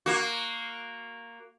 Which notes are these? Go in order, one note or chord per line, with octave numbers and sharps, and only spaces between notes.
A#3 F#4